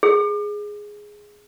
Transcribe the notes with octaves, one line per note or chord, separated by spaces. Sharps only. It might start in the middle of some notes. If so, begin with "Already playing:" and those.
G#4